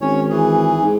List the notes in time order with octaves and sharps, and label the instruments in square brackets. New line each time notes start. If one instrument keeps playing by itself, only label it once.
[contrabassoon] G#1 [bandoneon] C#4 C#5
[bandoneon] E3 G#4
[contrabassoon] G#2